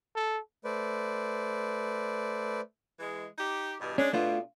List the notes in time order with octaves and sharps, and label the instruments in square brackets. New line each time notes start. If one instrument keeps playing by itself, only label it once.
[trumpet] A4
[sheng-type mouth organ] A3 B4 C5 D5
[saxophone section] E3 G#3
D#4 G4
E2 G2 B2
[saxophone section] G#3 D4 [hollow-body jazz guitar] C#4
[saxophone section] B2 [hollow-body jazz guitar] A3 D4 F4